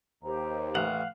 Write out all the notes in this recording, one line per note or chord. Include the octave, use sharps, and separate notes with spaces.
D#2 G4 C5 A#5
A1 F5 F#5